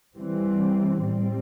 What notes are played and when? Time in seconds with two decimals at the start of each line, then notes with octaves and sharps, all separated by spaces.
0.16 E3 G3 C4
0.97 A2 G3 C4